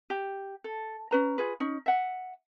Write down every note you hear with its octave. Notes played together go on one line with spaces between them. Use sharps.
G4
A4
C#4 B4 A#5
F4 G#4 B4
C#4 D#4
E5 F#5